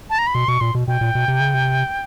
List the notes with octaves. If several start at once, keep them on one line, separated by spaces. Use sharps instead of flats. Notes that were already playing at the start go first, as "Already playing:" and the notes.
A5
A#5
B5
B2 C6
B2 C#6
A#2 C6
B2
B2 G5
A#2
B2
C3
C#3
C3